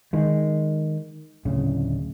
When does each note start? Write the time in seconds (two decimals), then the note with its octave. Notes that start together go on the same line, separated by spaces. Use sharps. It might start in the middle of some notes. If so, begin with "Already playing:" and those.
0.13 D#3 G#3
1.45 D1 C#3